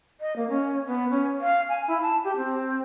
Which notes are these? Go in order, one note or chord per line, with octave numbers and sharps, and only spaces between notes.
D#5
A#3
C#4
B3
C#4
F5
G#5
E4
A5
G4
C4